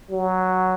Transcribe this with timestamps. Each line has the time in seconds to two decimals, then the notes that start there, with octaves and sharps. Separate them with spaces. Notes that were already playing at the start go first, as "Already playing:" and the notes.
0.10 F#3